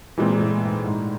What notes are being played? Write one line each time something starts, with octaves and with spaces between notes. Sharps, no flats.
A#2 E3 G#3 C4
A#2
A2
G#2
G#2